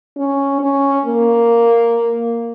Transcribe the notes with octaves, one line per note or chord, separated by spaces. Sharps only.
C#4
C#4
A#3